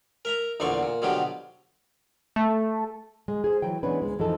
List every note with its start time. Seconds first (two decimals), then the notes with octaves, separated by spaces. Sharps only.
0.25 A#4 E5 A#5
0.60 A#1 E2 D3 C5 D5 C#6
0.83 A#2
1.02 B2 D3 F3 F#3 D4 G4
2.36 A3
3.28 G#3
3.44 G#4 C5
3.62 E3 F#3 G5
3.83 E3 G#3 B3 C#4 D4 B4
4.02 D2 G#3
4.19 F2 E3 F3 D#4 A4